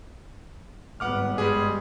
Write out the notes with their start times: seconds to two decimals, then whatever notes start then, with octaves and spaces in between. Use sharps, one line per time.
1.00 G#1 G2 B3 F#5 D6 F6
1.38 G3 G#3 G#4